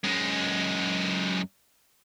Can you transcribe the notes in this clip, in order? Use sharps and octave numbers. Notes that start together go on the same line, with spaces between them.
F#2 G#3